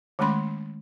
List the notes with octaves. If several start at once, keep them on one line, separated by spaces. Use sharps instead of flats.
D#3 G#3 A3 C#4 B5 C6